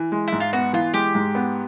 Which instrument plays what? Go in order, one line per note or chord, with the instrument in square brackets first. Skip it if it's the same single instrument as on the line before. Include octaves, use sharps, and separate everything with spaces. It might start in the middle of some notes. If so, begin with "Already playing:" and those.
Already playing: [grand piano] E3
G#3
[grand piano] G#2 [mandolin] E4
[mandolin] F4
[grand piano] B3 [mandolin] F#4
[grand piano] E3 [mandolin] F4
[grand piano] G#3 [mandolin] G4
[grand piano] G#2
B3